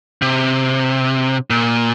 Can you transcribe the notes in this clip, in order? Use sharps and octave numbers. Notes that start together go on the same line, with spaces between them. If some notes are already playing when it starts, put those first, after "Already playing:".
C3
A#2